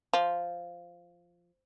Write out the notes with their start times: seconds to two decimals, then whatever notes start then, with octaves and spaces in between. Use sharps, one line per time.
0.13 F3